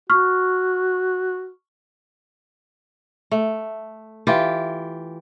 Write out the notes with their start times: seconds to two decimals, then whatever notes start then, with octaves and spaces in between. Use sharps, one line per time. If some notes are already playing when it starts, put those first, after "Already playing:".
0.10 F#4 C#6 F6
3.32 A3
4.27 E3 F4 G4